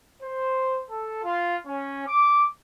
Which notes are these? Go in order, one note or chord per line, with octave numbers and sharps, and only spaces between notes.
C5
A4
F4
C#4
D6